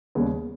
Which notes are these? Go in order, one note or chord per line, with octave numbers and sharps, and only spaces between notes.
D#2 C#3 G3 B3